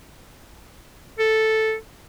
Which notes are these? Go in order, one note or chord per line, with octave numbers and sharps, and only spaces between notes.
A4